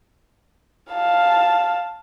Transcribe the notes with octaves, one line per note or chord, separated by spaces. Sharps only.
F5 A5